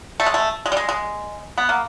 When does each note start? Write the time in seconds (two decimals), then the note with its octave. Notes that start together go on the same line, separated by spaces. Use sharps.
0.20 A3
0.26 G#3
0.34 A3
0.66 G#3
0.72 G3
0.77 G#3
0.89 G#3
1.58 B3
1.69 A#3